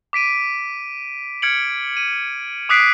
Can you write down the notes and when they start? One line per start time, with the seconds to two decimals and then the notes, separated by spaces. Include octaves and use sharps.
0.13 D6 B6 D7 D#7
1.42 F6 G#6 C#7 D7 F#7
1.97 D#7
2.69 D6 D#6 F#6 B6 C7 D7